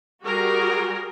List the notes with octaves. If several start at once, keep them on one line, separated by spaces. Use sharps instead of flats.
G3 F#4 G#4 A#4